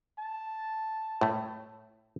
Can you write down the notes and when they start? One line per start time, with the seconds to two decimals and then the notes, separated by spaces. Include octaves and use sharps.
0.19 A5
1.21 A2 A3